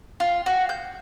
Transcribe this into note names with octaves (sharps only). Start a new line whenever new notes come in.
F4
F#4
G6